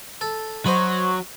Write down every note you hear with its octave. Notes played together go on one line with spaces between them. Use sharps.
A4
F#3 C5 D#5 B5 C#6